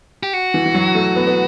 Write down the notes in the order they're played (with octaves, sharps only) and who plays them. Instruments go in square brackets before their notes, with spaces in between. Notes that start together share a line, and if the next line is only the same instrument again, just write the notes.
[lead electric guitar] G4
F#4
[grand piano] E3
E3
F#3
A3
B3
B3